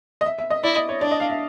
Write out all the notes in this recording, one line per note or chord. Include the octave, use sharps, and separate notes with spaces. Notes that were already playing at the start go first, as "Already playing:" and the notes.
D#5
E5
E5
D#5
E4 D5
D#5
C#5
D4 D5
D#5
F5
E5